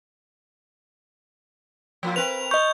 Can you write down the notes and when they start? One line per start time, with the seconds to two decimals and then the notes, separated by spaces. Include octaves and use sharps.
2.03 F3 A#3 F4
2.16 C4 A#4 B4 F7
2.51 D#5 C#6 G6 G7